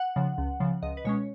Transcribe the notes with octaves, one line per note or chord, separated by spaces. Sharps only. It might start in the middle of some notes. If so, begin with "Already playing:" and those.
Already playing: F#5
C#3 F3
C#2
C#3 F3
C#2 D#5
B4
B2 G#3 C#4 C#5